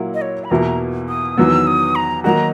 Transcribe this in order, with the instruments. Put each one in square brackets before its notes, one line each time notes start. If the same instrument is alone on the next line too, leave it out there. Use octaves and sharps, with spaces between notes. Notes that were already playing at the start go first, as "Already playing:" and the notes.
Already playing: [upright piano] A#2 F#3 A#3 E4
[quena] D#5
C#5
B5
[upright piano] E2 B2 A#3 E4 [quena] A#5
[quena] D#6
[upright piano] E2 D#3 F#3 B3 [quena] E6
[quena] D#6
A#5
[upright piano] D#3 F#3 A#3 D#4 F#4 [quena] A#5